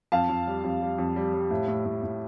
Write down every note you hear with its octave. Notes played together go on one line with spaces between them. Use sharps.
F2 F5 A5
F2
G3
F2
G3
F2
G3
G3
A2
A2
A2
A2